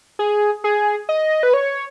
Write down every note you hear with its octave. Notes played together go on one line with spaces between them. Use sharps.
G#4
G#4
D#5
B4
C#5